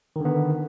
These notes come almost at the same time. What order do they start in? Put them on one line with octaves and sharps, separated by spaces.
D#3 D3 B3